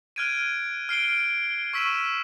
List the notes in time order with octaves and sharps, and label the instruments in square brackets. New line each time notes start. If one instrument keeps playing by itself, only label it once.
[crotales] F6 F#6 G#6 D7 D#7
F6 C7 D7 G7
D7
C#6 E6 B6 D#7 E7